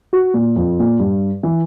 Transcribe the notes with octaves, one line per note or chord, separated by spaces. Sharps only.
F#4
A#2
F2
A#2
G2
E3